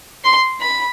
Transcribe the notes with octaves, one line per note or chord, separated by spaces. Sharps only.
C6
B5